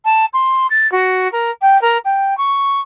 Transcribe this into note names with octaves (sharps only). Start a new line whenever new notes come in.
A5
C6
A6
F#4
A#4
G5
A#4
G5
C#6